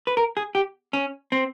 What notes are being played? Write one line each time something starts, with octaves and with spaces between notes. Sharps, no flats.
B4
A#4
G#4
G4
C#4
C4